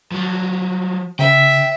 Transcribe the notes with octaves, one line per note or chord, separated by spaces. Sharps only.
F3 F#3
C#3 E5 G5